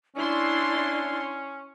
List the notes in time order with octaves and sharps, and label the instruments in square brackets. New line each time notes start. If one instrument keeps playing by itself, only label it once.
[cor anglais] C#4 [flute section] D4 D5 [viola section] E4 C6